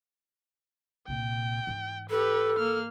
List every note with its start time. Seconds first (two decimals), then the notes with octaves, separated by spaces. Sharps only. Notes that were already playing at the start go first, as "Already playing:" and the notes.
1.08 C2 A#2 G5
1.67 G#2 E3
2.10 G4 A4 B4
2.59 A#3 F6